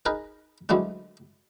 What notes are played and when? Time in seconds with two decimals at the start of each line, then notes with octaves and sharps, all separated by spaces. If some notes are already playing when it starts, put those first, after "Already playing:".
0.06 D#4 G#4 A#4 B4
0.69 D2 E3 F#3 G#3 A3 D4